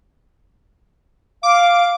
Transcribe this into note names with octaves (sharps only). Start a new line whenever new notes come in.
F5 D6